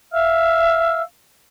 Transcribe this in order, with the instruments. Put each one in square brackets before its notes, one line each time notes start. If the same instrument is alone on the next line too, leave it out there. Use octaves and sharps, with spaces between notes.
[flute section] E5 F5 E6 F6